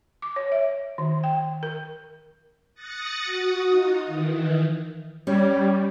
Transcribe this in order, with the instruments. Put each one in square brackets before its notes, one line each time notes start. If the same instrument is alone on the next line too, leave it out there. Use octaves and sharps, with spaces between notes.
[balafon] D6
C#5
E5
D#3
G5
A#4
[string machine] D#6 F#6 A6 A#6 C#7
F#4 D#6
D#4 F4
D#3 E3
[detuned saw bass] G3 [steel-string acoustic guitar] C#4